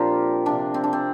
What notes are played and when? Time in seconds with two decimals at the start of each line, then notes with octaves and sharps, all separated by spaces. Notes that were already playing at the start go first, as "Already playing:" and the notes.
Already playing: A#2 F3 C4 D4 F4 G4 A#4 C5
0.46 C3 F3 D4
0.74 C4
0.84 D4
0.93 C4